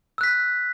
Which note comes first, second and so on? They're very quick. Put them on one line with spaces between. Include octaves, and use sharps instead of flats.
E6 F#6 B6